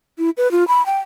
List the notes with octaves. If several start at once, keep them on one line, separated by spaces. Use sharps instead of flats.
E4
B4
F4
B5
G5